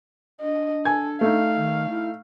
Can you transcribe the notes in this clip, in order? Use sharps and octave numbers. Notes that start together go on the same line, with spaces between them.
D4 D#5
A4 G#5 G#6
A3 D#4 F5
D#3
E4